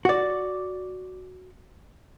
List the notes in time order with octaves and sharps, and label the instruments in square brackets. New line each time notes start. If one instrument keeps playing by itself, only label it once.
[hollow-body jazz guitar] F#4 D5